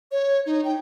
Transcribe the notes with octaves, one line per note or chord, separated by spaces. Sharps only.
C#5
D#4
G5